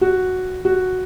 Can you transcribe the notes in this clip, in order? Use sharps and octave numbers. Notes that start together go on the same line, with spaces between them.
F#4
F#4